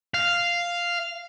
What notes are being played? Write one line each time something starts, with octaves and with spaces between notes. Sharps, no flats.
F5